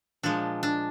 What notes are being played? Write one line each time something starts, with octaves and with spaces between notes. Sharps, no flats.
A#2 F3 G#3 D4
D4